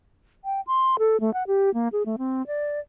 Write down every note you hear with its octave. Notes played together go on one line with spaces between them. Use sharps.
G5
C6
A4
A3
F#5
G4
A#3
G#4
A3
C4
D5